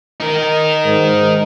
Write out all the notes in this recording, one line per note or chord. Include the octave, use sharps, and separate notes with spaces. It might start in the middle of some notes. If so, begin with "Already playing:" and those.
D#4 A#4
G#2